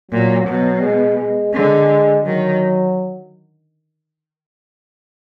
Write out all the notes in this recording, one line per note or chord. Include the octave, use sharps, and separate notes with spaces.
A#2 F#3
B2 F#3
G#3
G#3
D3 G#3
D#3 F#3